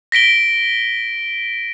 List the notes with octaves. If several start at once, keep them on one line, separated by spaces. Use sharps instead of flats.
A#6 B6 D7 G7